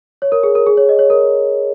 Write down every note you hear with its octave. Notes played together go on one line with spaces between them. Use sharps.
C#5
A#4
G#4
A#4
G#4
C#5
D#5
C#5
A#4